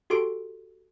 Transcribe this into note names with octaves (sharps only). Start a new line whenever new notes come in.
F#4 G4 A4 C6 D7